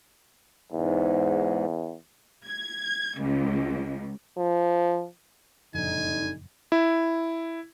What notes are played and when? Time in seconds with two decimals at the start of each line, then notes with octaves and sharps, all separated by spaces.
0.72 E2 G#2
2.46 G#6
3.19 C#2
4.37 F3
5.74 F#1 C2 F2 A#2 D3 D#4 G#5
6.72 E4